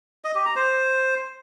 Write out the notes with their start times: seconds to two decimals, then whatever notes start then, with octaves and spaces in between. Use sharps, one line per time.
0.24 D#5
0.35 G4
0.46 A#5
0.56 C5